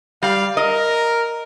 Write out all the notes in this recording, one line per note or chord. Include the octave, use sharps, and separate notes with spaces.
G3 F5
A#4 D#5